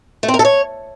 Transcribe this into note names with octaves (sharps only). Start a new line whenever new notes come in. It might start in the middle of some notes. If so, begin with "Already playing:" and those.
A3
C4
A#4
A4
C#5